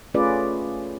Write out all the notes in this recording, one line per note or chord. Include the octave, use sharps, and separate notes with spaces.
A3 C#4 F4 G#4 B4 D5